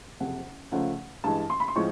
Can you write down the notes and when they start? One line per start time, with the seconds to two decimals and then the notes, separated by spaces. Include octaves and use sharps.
0.20 F#1 F2 C3 F#5
0.72 C#2 C#3 F3 A3 F#5
1.24 G2 E3 G#3 A5
1.50 C6
1.60 B5
1.68 C6
1.76 A2 F3 G#3 C4 C#6